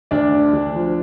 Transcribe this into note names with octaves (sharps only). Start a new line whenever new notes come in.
D2 D4 D5
D3
D2
F3